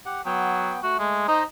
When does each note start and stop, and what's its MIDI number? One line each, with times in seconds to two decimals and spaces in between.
0.06 0.22 67
0.06 0.22 78
0.26 0.78 54
0.26 0.81 59
0.26 0.81 79
0.83 1.25 57
0.83 0.97 66
0.99 1.23 56
1.28 1.43 63
1.28 1.43 72
1.28 1.43 75
1.28 1.43 82